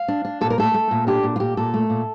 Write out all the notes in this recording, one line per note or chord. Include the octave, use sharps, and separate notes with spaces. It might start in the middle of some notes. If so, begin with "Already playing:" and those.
Already playing: F5
D4
D4
A#2 A4
A#4
A3 A4
A3
A#2
D4 G4
A#2
F4
A#2 G4
A#2 A4
A3
A#2